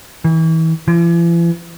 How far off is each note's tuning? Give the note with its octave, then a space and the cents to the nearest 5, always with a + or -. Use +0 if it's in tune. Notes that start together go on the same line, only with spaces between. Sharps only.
E3 -35
E3 +45